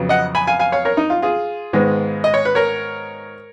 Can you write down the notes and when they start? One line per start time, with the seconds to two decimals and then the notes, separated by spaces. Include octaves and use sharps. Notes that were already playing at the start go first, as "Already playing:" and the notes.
Already playing: F2 C#3 F#3 B3
0.09 D#5 F#5
0.35 G#5 B5
0.47 F5 G#5
0.59 F5 G#5
0.72 C#5 F5
0.85 A#4 C#5
0.97 D#4
1.10 F4
1.22 F4 G#4
1.73 G#2 D#3 G#3 B3
2.24 D#5
2.34 C#5
2.45 B4
2.55 A#4 C#5